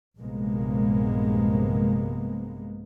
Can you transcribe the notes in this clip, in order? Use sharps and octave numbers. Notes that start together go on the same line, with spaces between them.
A#1 G2 C3 G#3 A#3 B3